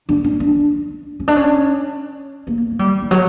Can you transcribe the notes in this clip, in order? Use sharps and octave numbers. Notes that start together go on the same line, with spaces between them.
D4
C#4
D4
C#4
D4
C#4
A#3
A#3
G3
E3
F#3